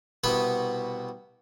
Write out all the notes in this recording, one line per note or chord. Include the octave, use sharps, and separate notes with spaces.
C2 B2 B3 F#5 B5